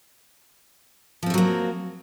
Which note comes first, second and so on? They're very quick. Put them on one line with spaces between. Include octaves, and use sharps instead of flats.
F3 C4 A3 F#3 A#3